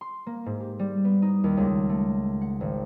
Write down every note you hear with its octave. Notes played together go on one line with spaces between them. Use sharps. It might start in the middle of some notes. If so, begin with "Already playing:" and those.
C6
A#3
G#2
G4
G3
B3
D#4
D#2
C#2
A3
F#5
G#1